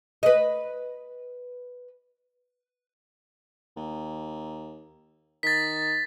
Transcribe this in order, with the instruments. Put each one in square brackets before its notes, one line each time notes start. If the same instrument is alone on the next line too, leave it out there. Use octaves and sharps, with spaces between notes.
[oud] B4 D#5
[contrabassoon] D#2
[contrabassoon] D#3 [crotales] A6 B6